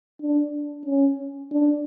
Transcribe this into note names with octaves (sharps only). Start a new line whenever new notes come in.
D4
C#4
D4